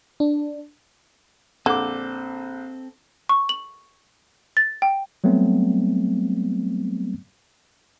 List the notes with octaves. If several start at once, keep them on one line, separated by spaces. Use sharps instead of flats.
D4
A#1 D3 C4 A4 D6
C#6
F#7
A6
G5
F#3 G3 A3 B3 C4